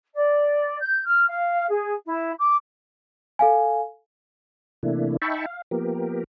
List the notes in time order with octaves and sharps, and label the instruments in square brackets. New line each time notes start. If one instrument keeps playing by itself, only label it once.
[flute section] D5
G6
F6
F5
G#4
E4
D6
[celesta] A4 F5 G#5
[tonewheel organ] C3 E3 A3 A#3 D4 E4
D#4 E5 G5 A5 B5 C#6
F5
F3 A#3 B3 G4 A#4